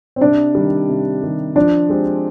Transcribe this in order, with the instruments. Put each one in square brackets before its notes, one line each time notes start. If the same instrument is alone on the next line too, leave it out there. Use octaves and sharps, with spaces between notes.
[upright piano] C4
[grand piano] C3 [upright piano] D4
[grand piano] D#3 G3
C3
D#3 G3
[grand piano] F3 [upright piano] D4
[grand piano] G#3 C4 G4